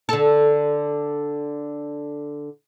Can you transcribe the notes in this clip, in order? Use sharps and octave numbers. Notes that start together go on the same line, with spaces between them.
D3 A4